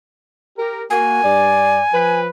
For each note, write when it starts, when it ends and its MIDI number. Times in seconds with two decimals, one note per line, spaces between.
0.58 0.82 67
0.58 0.82 70
0.90 1.19 58
0.90 1.19 66
0.90 2.20 80
1.23 1.80 43
1.23 1.80 74
1.93 2.27 53
1.93 2.27 71